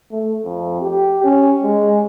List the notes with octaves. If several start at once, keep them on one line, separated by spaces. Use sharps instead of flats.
A3
F2
G4
C#4
G#3